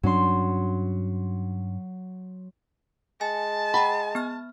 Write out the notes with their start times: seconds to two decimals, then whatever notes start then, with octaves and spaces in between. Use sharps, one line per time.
0.03 G2 F#3 C#4 D4 C6
3.21 G#3 G#5 A5
3.74 F#5 G5 A#5 B5
4.15 B3 F6